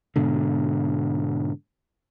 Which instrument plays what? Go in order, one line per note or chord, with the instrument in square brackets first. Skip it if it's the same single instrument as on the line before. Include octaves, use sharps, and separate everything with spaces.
[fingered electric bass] G#2 B2 D3